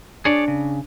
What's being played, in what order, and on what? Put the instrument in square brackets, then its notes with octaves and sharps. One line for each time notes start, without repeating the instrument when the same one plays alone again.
[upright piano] D4 [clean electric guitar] G#4 C#5 D5
[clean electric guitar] C#3